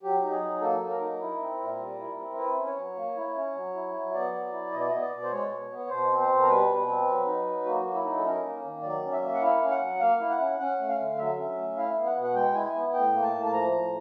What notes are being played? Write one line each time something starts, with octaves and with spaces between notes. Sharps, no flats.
F#3 G4
D#4
G#4
F#3
A#3 A4
F#3
A#4
D#4
E4
C4
A#2
G3
E4
C4
E4 B4
C#4
C#5
F#3
A#3
E4
C#4
F#3
E4
F#3
B3 D5
F#3
E4
B2 D#5
D5
D#5
B3
D5
B2
C5
G#3 C#5
B2
B3
C#5
B2 C5
C4
C5
B2
A#4
G3 B4
B2
C4
F#3
D#4
F#3
A#3 F#4
F#3
E4
D#4
A4
C#4 A#4
A#3
D#3
F#3 D5
C#4
E5
A#3
F#5
E4 F5
C#4
F#5
F#3
A#3 F5
E4
F#5
C#4
C#4 F#5
A3
F5
D3
F#3 E5
C#4
A3
E4 F5
B3
F#5
B2
F#5
G#3 G5
E4 G#5
B3
A2 G5
A#3
A5
A2
A5
F3 A#5
A2